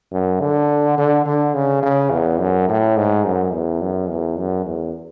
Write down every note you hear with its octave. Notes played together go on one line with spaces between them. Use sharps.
F#2
D3
D3
D3
C#3
C#3
E2
F#2
A2
G#2
F#2
E2
F#2
E2
F#2
E2